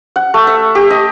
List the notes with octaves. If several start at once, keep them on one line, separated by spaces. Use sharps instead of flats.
F#5
A3
E5
G4
D#5